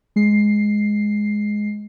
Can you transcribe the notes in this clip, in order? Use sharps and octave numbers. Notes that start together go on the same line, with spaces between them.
G#3 C7